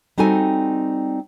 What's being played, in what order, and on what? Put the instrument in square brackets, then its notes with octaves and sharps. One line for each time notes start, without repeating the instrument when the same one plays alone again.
[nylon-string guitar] G3 C4 D#4 F#4 A4 G#5